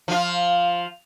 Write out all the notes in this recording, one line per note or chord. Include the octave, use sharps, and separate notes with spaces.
F3 F4